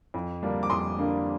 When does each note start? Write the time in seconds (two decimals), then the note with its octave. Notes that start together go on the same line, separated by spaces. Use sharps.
0.14 F2
0.43 D3 G3 A#3 D4
0.63 D6
0.70 F2 C6 D#6
0.98 D3 G3 A#3 D4